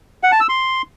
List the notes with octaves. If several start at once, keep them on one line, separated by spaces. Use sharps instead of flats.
F#5
A5
E6
C6